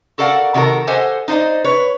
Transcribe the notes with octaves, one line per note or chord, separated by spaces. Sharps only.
F#4 A4 A#4 D5 F5 F#5
C3 D#3 F#4 A4 A#4
G4 A4 C5 D#5 F#5 G#5
D#4 C5 D5 D#5
B4 C#5